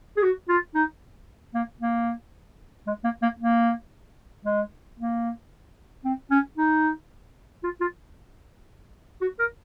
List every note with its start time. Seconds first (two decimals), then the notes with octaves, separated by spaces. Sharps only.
0.17 G#4
0.22 F#4
0.49 F4
0.75 D#4
1.54 A#3
1.81 A#3
2.87 G#3
3.04 A#3
3.22 A#3
3.40 A#3
4.45 G#3
4.99 A#3
6.05 C4
6.31 C#4
6.58 D#4
7.64 F4
7.81 F4
9.21 F#4
9.39 A#4